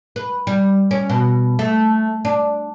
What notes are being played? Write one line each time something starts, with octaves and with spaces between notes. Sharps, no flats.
B4
G3
C#4
B2
A3
D4